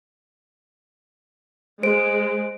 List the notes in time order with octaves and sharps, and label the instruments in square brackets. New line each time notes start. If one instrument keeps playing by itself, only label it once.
[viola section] G#3 [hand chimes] C5 D7